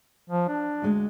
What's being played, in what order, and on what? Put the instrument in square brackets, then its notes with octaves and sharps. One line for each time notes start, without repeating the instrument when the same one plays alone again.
[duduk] F3
D4
[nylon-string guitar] D2 G#3